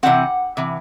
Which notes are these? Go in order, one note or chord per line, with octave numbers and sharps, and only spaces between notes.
C3 E3 C4 F#5
C3 E3